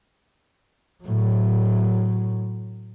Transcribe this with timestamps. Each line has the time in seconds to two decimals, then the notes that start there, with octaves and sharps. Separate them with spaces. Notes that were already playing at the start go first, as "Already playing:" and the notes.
1.04 A2 F#3